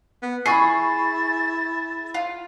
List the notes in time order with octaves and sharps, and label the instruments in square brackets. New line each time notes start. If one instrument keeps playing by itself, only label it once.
[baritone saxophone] B3
[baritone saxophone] E4 [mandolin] G#4 [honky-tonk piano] B5 C#6 C7 [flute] A6
[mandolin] F4